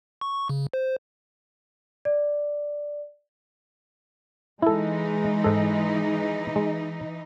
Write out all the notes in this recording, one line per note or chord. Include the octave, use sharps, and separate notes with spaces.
C#6
C#6
C#3
C5
D5
E3 G#3 D#4 E4 A4
G#2 A4
G#3